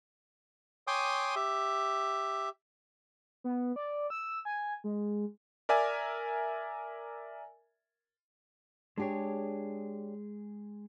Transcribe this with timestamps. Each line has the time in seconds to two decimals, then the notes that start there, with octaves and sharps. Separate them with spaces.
0.87 C#5 G5 G#5 C6 D6 D#6
1.36 G4 E5
3.44 B3
3.76 D5
4.10 E6
4.45 G#5
4.84 G#3
5.69 A#4 D5 E5 G#5 G#6
8.98 G#3 D4 G4 G#4 C#5